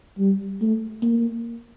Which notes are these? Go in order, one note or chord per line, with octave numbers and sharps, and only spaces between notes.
G3
A3
A#3